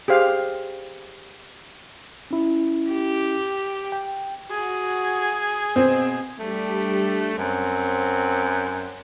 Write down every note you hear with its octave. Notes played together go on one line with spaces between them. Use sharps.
G4 G#4 C5 F5
C#4 E4
G4
G5
F#4 G#4
B2 C4
G3 A3 D4 G4
F#2 C4